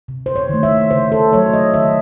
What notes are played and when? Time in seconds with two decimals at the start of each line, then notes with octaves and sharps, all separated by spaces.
0.08 C3
0.26 C5
0.36 C#5
0.49 D#3 A3
0.63 E5
0.91 C#3 C5
1.12 A4
1.33 F#3 A3 C#5
1.53 D#5
1.74 D#3 E5